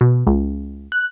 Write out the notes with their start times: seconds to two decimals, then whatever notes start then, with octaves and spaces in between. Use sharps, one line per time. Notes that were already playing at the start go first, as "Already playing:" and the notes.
0.01 B2
0.27 C#2
0.92 F#6